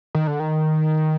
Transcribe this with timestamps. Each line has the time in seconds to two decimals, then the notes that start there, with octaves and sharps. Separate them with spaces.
0.15 D#3
0.27 D3
0.40 D#3